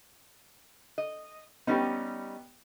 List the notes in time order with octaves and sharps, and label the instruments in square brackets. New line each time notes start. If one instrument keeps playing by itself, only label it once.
[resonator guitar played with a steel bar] D#5
[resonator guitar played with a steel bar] G3 C#4 D#4 [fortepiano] B3 G4